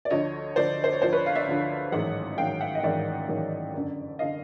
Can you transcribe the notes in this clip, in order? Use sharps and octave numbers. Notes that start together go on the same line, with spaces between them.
D5
D2 D3 F3 C#5 D#5
D2 D3 F3 C5 D5
C5
C#5
D2 D3 F3 C5 D5
B4 C#5
F5
D5 E5
D2 D3 F3
A1 G#2 D#3 F#3 E5 F#5
A1 G#2 D#3 F#3 F5 G5
E5 F#5
D#5
A1 G#2 D#3 F#3 D5 E5
A1 G#2 D#3 F#3
G1 F#2 D3
D3 D#5 F5